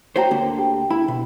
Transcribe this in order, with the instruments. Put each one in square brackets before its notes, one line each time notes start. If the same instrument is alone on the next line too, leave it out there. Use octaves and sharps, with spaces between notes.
[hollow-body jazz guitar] F#4 G4 C5 [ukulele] C#5 G5 A#5
[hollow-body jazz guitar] D2 D3 A#3
[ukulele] G4
[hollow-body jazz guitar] E4 [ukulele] B5
[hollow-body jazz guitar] B2